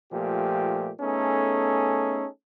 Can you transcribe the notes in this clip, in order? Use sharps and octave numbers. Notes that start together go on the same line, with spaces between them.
A#2 F3 A3 G4
A3 B3 C#4 D#4 G#4 A4